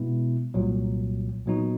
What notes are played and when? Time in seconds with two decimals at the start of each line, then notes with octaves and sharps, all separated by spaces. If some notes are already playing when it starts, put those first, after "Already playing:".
Already playing: B2 G#3 B3 E4
0.54 C2 A#2 F#3
1.46 A#2 F#3 B3 D#4 F#4